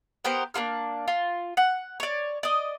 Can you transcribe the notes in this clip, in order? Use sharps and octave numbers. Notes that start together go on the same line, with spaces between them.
B3 G4 A#4 C5
A#3 D4 F4 F6
F4
F#5
C#5 D5
D5 D#5